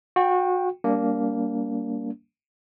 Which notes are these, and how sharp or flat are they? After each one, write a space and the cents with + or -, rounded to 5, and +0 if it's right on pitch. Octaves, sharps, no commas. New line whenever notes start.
F#4 -30 G5 +0
G3 +0 A#3 +0 D4 -35